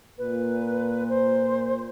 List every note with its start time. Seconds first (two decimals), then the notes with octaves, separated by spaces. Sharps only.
0.18 A#2 B4
1.09 C5